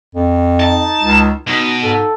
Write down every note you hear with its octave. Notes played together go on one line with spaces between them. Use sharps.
F2
D#4 A5
C#2
B2 D#4
G#2 A4